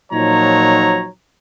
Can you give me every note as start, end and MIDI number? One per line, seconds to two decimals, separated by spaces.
0.13 1.08 46
0.13 1.08 53
0.13 1.08 54
0.13 1.08 63
0.13 1.08 73
0.13 1.08 82